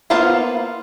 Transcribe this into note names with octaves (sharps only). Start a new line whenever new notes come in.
A#3 B3 F4 C5 F5